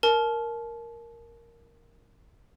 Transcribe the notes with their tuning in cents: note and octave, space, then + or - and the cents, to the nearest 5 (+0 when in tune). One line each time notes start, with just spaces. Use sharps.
A#4 +0 A5 -35